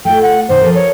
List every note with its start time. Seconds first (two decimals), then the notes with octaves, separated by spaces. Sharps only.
0.05 A3 F4 G5
0.22 F#5
0.49 B2 D#3 A#3 C5
0.61 F3 A4 A#4
0.75 C#5